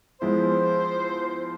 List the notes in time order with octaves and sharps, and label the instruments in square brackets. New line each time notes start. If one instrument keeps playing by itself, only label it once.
[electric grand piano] F3 G#3 B3 E4 [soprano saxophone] C5